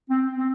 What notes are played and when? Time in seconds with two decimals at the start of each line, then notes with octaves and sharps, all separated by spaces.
0.10 C4
0.38 C4